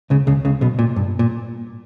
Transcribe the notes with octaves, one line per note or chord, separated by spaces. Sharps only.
C#2 C#3
C#2 C#3
C#2 C#3
B1 B2
A#2
G2
A#2